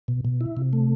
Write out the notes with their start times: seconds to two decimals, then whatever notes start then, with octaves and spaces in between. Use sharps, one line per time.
0.08 B2
0.25 B2
0.41 E4
0.57 C3
0.73 A3